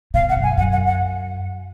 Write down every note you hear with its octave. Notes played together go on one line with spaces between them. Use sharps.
B2 F5
F#5
F#2
G#5
F#2 F#5
F#5
F#5